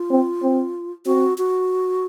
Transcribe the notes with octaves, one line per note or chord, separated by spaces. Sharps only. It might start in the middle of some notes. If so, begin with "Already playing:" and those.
Already playing: F4
C4
C4
C4 F#4
F#4